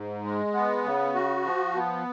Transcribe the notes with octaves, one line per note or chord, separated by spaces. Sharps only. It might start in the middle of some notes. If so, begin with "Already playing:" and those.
Already playing: G#2
G#3
B3
C#3
F#4
F3
B3